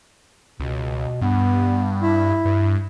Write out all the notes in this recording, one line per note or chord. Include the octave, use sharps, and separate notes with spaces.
C#2 B2
G2 B3
E4
G2